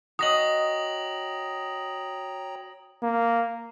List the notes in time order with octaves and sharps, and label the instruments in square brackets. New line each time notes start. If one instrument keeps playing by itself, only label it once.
[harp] F#4 D#5 [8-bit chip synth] C#5 G5 A#5 [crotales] D#6 A#6 F#7
[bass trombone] A#3